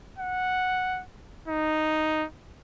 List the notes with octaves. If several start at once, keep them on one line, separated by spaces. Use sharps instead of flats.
F#5
D#4